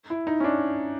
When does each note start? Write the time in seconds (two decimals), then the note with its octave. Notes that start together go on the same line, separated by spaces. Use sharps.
0.10 E4
0.27 D#4
0.40 C#4
0.44 D4